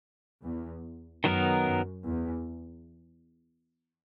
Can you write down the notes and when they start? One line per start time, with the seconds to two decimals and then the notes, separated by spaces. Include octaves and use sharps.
0.43 E2
1.24 F#2 D#3 F#3 B3 D#4 A#4
1.65 F#2
2.05 E2